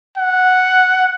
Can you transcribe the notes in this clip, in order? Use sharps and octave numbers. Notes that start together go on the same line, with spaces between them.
F#5